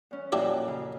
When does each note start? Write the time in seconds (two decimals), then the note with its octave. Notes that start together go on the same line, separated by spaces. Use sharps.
0.11 E2 C#4
0.32 F2 A#2 F#3 D4 E4 G4
0.68 C#3